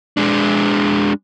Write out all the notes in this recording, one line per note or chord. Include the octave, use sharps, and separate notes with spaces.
G#3 D4